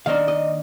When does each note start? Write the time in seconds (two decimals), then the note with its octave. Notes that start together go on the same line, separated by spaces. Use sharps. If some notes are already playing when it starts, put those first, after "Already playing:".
0.06 D#3 A#3 D4 F5
0.28 D#5